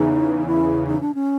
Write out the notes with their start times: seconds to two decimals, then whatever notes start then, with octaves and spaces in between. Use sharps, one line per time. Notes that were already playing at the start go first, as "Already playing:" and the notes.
Already playing: E2 C#3 E3 D#4
0.46 E4
0.87 D#4
1.01 D4
1.15 C#4